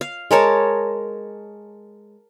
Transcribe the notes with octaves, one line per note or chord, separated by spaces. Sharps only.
F5
G#3 A#4 C#5 A5